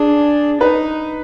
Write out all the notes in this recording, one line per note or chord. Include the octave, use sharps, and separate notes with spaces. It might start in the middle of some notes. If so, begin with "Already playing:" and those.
Already playing: D4 G#4
D#4 B4